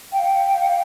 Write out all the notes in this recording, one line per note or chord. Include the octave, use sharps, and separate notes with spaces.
F5 G5